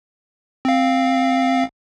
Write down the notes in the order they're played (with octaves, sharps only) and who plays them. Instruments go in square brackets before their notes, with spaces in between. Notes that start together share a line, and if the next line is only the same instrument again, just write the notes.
[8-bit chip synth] C4 F5